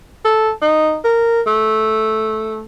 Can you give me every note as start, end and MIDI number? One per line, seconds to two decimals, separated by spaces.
0.25 0.51 69
0.61 0.96 63
1.04 1.41 70
1.47 2.64 57